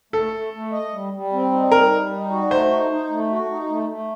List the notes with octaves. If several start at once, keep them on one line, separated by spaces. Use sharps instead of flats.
A3 A4
A3
A3
D#5
G3
G3
C4
D#4
G3 A#4
G3
D#4
F#4
A3 C5
D#4
D#4
A3
F#4
D#4
A3
A3